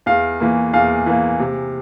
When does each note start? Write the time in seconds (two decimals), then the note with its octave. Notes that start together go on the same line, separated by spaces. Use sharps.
0.06 E2 F5
0.40 E3 A#3
0.73 E2 F5
1.06 E3 A#3
1.40 C3